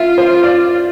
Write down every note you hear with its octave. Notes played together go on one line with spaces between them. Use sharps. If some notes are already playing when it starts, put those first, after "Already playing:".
Already playing: F4 E5
C5
D5